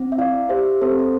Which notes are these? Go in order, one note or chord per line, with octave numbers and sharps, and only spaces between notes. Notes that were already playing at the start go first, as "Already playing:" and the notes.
Already playing: C4
E5
E4 D5 F5
G4 C5 E5
C4 A4 C5
C5